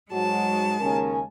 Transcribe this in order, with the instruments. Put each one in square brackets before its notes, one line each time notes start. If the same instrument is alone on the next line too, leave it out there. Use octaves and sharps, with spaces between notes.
[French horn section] G#2 F#3 F#4 [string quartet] G#3 A5
[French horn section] D#2 C#3 C#4 [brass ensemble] A#4 G#5